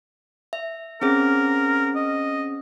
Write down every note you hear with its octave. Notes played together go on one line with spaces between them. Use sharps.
E5
C4 C#4 G#4 A#4
D#5